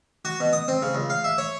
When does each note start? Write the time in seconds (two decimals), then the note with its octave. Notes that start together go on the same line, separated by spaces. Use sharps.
0.25 F#4
0.40 B2
0.53 D#6
0.68 C4
0.82 C#3
0.94 C#2
1.10 F5
1.24 E5
1.38 C#5